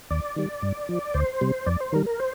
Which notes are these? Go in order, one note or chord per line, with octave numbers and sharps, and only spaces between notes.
D#2 D5
D#3 G3
G2
F3
D2 C5
C3 G3
F2 D5
C5
D#3 G3 A#4
A#4
C5